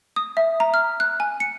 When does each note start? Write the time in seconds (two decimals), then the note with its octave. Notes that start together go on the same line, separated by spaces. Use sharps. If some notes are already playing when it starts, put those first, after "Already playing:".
0.16 D#6
0.37 E5
0.60 A#5
0.74 F6
1.00 F#6
1.20 G#5
1.40 C#7